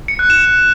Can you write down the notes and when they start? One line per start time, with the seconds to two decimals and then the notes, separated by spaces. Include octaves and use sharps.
0.08 C#7
0.19 F#6
0.30 E7